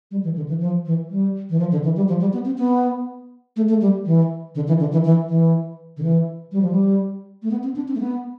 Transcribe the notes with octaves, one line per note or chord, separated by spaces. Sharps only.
G3
E3
D3
E3
F3
E3
G3
E3
F3
D3
E3
G3
F3
G3
B3
C4
B3
A3
A3
G3
E3
D3
E3
D3
E3
E3
E3
D3
E3
G3
F3
G3
A3
B3
C4
D4
C4
A3
B3